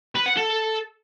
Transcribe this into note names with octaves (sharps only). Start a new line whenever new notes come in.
B4
F#5
A4